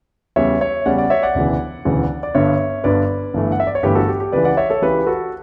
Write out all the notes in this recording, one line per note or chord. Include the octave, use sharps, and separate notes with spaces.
E2 C#3 G3 C#4 C#5 E5
C#5 E5
E2 C#3 G3 C#4 D5 F#5
D5 F#5
C#5 E5
D5 F#5
E1 D2 C#3 E3
E1 D2 C#3 E3
D5
G1 G2 D3 C#5 E5
G1 G2 D3 B4 D5
G1 G2 E3 A3
F#5
E5
D5
C#5
G1 G2 E3 A3 G4 B4
F#4 A4
G4
G4
C#2 C#3 E3 B4 D5
D5 F#5
C#5 E5
A4 C#5
C#2 C#3 E3 G4 B4
F#4 A4